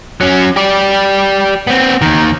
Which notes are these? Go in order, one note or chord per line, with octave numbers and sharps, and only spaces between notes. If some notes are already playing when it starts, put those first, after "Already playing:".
F#3 C#4
G4 D5
B3 C4
D#2 D#3